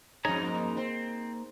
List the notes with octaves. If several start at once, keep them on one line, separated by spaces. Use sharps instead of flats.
F2 G#2 D#4 G#4 C#5 A#5
A#3
C4